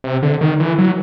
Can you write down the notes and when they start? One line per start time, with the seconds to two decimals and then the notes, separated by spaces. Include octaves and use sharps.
0.04 C3
0.23 D3
0.41 D#3
0.60 E3
0.78 F#3